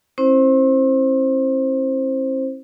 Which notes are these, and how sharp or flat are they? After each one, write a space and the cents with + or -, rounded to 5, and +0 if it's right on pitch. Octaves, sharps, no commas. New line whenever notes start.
C4 +40 E4 -15 C5 +10